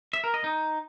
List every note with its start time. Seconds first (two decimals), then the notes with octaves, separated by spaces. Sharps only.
0.13 E5
0.24 A#4
0.34 D#5
0.44 D#4